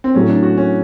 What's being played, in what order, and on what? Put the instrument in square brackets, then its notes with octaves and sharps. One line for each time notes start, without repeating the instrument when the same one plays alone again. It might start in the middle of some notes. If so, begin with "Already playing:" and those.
[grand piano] C4
[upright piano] A2 F#3 A3 [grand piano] C#4
[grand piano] D4
F#4
C#4